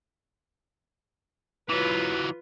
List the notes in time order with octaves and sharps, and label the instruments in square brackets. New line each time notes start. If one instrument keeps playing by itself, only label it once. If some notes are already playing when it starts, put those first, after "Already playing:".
[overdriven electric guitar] E3 F#3 [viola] F4 B4